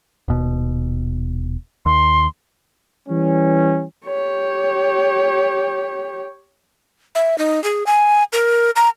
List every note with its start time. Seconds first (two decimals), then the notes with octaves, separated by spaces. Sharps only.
0.28 D#1 B2
1.86 D#2 C6
3.08 E3 G3 C#4
4.06 G4 C#5
7.15 E5
7.38 D#4
7.64 G#4
7.87 G#5
8.33 A#4
8.76 A#5